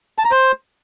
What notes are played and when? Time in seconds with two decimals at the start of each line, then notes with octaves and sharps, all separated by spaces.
0.18 A5
0.25 A#5
0.31 C5